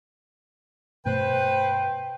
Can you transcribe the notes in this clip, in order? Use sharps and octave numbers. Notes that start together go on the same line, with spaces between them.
G2 B2 A3 B4 C5 G5